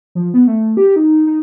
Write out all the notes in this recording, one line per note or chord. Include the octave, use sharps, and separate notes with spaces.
F3
B3
A3
G4
D#4
D#4